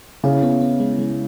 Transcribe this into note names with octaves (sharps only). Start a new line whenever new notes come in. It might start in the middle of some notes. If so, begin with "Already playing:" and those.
C#3 E4
B3
B3
G#3
G#3